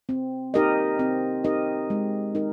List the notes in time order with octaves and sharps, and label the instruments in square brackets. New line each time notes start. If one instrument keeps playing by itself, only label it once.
[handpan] C4
D#4 G4 A#4 D#5
C4
D#4 G4 A#4 D#5
G#3
D#4 A#4